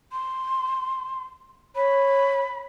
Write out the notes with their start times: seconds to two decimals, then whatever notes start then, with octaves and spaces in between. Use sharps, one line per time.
0.12 C6
1.76 C#5 B5